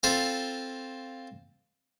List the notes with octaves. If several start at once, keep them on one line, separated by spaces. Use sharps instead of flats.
C4 F4 A4 C5 B5